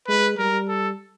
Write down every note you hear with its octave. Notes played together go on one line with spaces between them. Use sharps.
G#3 B4
G3 A#4
A4